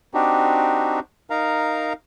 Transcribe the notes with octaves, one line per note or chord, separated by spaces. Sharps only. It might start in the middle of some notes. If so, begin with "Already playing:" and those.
C4 D4 D#4 F#4 G4
D#4 A#4 F5 A#5